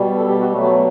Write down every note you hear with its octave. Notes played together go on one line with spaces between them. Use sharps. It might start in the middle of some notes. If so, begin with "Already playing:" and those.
Already playing: B2 G3
A4
G4
F#4
B2 F#3 A3 B3
B3